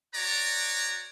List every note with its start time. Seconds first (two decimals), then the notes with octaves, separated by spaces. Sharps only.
0.14 F#4 B4 C#5 D5 A#5